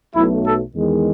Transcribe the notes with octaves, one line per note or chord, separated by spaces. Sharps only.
B1 B2 F#3 A3 E4
A4
E2 D#3 G#3